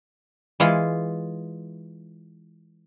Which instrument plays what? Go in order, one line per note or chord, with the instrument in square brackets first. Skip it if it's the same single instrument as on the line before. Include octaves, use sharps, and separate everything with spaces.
[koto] E3 G#3 F4